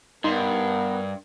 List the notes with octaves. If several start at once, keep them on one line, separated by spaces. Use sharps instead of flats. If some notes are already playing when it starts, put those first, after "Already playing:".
G2 B3 D#4 A#4 C6